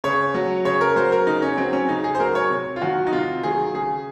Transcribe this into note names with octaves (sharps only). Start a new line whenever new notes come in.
C#3 C#5
F#3
C#3 C#5
A#4
F#3 C5
A#4
C#3 D#4
C#4
F#3 C4
C#4
C#3 D#4
G#4
C5
F#3 A#4
C#5
C3
F4
D#3 F#3 F#4
D#4
C3 F4
D#3 F#3 G#4
C#3 G#4